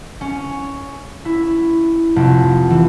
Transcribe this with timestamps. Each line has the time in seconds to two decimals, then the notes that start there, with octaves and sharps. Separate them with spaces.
0.21 C#4
1.25 E4
2.16 F1
2.70 E3